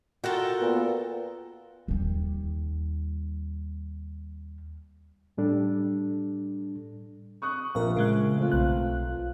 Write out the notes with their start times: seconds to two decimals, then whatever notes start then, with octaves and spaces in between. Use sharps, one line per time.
0.24 F4 F#4 A4 A#4 G5
0.61 A#2 B3
1.88 D#2 G3
5.38 A2 G3 D4 A4
7.42 C#6 D#6 F#6
7.75 A#1 F3 A#4 F5
7.97 C#3 G#3 F#6
8.37 A3 C4 F4
8.52 B1 F#6
9.08 F4